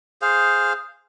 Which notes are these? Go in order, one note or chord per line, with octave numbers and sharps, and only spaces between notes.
G#4 C5 F5